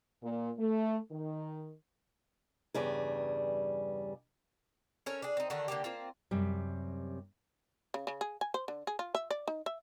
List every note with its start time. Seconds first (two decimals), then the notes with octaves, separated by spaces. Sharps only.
0.22 A#2
0.58 A3
1.11 D#3
2.74 E2 G2 C#3 G3 G#4
5.06 C#4 A4 A#4 C#5
5.22 D4 G#4
5.37 C4 D#4
5.50 D3 D#3 A3 F#4
5.68 D3 A#3 C4 G4
5.84 A#3 C4 F4
6.31 F#2 C3 G3
7.94 C#3
8.07 C#3
8.21 G#4
8.41 G#5
8.54 C5
8.68 D3
8.87 G#4
8.99 F4
9.15 E5
9.31 D5
9.48 D#4
9.66 E5